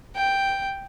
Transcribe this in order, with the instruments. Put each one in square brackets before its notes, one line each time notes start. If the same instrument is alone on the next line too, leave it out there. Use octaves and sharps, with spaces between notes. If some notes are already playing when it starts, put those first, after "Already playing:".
[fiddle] G5